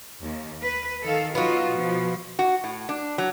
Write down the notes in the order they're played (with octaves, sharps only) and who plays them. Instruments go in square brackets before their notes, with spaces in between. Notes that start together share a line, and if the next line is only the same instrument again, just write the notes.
[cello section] D#2
B4
D#3 A4 F5
[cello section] F#3 D#4 F4 [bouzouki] B3 F#4
[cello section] B2 F3
[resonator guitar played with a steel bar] F#4
A2
D4
F#3